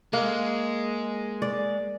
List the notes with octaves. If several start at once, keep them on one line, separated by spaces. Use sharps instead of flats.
G#3 A#3
D5